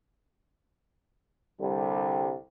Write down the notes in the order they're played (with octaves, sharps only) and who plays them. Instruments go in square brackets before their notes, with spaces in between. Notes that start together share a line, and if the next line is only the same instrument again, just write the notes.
[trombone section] C2 D3 G3